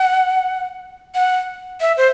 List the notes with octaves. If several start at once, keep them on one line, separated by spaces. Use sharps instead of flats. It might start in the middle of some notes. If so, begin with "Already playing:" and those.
Already playing: F#5
F#5
E5
C5